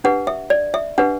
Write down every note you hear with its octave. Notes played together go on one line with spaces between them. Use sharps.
D4 G4 B4 F#5
E5
D5
E5
D4 G4 B4 F#5